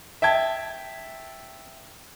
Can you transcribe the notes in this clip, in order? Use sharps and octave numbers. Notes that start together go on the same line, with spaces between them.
E5 G5 A5 G#6